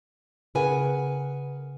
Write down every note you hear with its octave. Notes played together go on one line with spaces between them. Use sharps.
C#3 G#4 A#4 B4 F#5 G#5